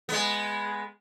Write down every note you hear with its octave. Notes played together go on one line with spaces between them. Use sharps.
G#3 B3